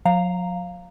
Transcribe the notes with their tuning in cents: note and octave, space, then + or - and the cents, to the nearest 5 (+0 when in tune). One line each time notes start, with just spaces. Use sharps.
F#3 -45 F5 +0 A#5 -10